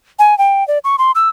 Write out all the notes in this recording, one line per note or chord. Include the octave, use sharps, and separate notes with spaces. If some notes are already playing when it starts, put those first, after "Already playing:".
G#5
G5
D5
C#6
C6
E6